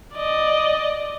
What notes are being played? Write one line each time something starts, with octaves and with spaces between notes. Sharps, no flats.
D5 D#5